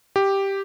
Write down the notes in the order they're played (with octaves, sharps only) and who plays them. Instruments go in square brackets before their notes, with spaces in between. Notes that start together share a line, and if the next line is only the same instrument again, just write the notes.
[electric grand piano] G4